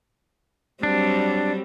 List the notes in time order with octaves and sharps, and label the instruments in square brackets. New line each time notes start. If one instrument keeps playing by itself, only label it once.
[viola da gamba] F#3 G3 C4 [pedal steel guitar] D4